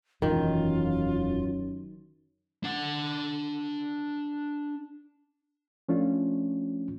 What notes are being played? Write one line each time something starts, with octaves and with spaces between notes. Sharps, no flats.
E1 F#2 D#3 E3 F4
D4 F#5
F3 A3 C#4 D4 F4